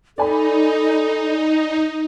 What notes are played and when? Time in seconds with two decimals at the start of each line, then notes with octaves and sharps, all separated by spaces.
0.18 D#4 A4 D5 G#5 B5